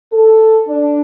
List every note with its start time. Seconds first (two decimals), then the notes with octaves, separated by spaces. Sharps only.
0.12 A4
0.67 D4